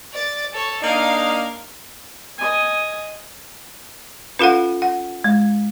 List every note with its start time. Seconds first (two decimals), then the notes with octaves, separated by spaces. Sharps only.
0.13 D5
0.53 A4 C#5
0.83 A#3 D4 D#4 F5
2.38 D#5 G#5
4.39 C#4 F4 A4 B4 F5 F#5
4.82 F#5
5.24 G#3